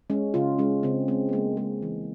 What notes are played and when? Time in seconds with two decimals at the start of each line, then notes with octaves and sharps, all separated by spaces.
0.10 G#3 C#4
0.34 C#3 F4
0.59 G#3 C#4
0.83 C#3 C4
1.08 G#3 C4
1.29 B3
1.33 G#3 A#3
1.57 G#3
1.82 E3